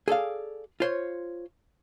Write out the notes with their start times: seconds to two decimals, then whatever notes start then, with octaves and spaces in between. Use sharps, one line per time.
0.08 G#4 A4 D5 F5
0.80 F4 C5 C#5